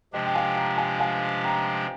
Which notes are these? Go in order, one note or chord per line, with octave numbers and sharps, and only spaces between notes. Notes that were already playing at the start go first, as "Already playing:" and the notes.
C3 F3 G#3 D4 G4 D#5 G5
G5
F5 G#5
G5 A#5
F5 G#5
F5 G#5
G5 A#5